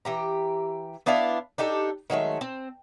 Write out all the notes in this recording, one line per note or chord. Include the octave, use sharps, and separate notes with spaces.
E3 G4 A#5
B3 D4 E4 F5
D4 D#4 G4 A4
D#3 F#3 G#3 A3
C4